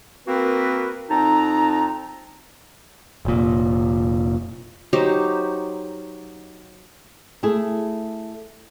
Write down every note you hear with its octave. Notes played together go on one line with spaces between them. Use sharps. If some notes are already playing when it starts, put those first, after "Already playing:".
A#3 C4 F#4 A#4 B4
F2 C4 D#4 A5 A#5
F1 A#2
F#3 D#4 G4 C5
A3 E4 G#4